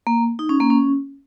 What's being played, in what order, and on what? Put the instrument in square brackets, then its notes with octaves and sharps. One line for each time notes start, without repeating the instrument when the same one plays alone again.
[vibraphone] A#3
D#4
C#4
A#3
C#4